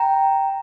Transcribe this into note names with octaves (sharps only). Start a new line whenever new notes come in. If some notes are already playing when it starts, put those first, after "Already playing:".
Already playing: G5 A#5